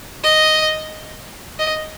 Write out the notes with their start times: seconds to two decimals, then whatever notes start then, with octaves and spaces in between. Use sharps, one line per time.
0.24 D#5
1.59 D#5